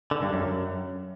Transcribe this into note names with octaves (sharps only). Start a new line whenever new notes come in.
D3
G2
F#2